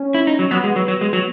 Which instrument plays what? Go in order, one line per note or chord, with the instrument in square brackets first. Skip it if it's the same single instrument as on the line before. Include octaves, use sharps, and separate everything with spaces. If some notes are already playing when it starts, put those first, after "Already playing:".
Already playing: [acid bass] C#4
[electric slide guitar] E4
D#4
F#3
[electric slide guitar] F#3 [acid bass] B3
[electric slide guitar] G#3
F#3
F#3
G#3
F#3